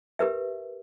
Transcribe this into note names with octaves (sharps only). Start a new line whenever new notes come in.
G4 A#4 B4 E5